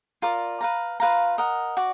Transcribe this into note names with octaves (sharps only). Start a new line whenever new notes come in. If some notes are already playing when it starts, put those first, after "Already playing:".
F4 A#4 D5
B4 F5 A#5
F4 B4 F5 A#5
A#4 D#5 F#5
F#4 D5